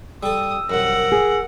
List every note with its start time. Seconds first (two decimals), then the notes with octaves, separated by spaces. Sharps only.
0.23 G3 A4 D#6 E6
0.70 C2 F#2 A#4 F#5
1.12 G#4